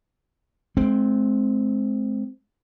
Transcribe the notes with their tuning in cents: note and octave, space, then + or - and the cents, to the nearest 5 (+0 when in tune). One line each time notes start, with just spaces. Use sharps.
G#3 +40 C4 +0